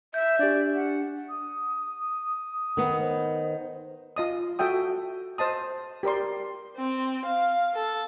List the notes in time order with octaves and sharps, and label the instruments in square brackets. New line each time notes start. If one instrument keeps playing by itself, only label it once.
[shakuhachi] E5 [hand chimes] G6
[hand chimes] D4 G4 [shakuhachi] D5
[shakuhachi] F#5
[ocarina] D#6
[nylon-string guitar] D#3 B3
[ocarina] C5
[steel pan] F4 D#5 D#6
F#4 A4 E5 G5 D#6
C5 D#5 A5 D#6
G4 A#4 D5 C6
[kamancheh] C4
F5
A4